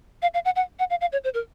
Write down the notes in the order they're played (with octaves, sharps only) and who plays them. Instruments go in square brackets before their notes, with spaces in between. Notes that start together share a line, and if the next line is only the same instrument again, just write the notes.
[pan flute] F5
F5
F#5
F#5
F#5
F5
F5
C#5
C5
A#4